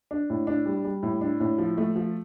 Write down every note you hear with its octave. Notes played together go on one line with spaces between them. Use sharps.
D4
A2
D4
G3
G3
A2
D4
A2
F3
A3
F3